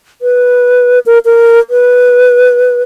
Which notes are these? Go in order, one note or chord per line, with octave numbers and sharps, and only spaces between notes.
B4
A#4
A#4
B4